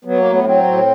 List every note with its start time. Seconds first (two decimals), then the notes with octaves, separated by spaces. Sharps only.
0.05 F#3 B3
0.18 A#3
0.24 A2
0.31 B3
0.44 F#3 C4
0.63 A2